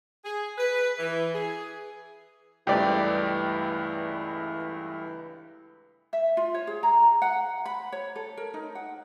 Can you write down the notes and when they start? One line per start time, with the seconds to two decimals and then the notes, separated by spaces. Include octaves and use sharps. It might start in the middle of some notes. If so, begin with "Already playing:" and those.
0.25 G#4
0.57 B4
0.98 E3
1.35 G#4
2.67 C#2 G2 E3 A3 G4 D5
6.13 E5
6.37 F4
6.54 C#5
6.67 G#4
6.83 A#5
7.22 F#5
7.66 B5
7.92 C#5
8.16 A4
8.37 A#4
8.54 D#4
8.75 F#5